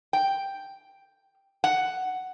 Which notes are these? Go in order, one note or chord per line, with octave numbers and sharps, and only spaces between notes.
G5
F#5